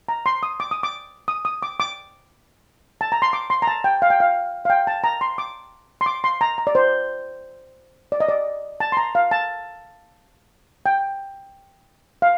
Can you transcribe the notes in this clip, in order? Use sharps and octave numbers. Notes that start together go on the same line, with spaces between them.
A#5
C6
D#6
D6
D#6
D6
D#6
D#6
D6
D6
A5
A#5
C6
D6
C6
A#5
A5
G5
F5
G5
F5
F5
G5
A5
A#5
C6
D6
C6
D6
C6
A#5
A#5
D5
C5
D5
D#5
D5
A5
C6
A#5
F5
A5
G5
F5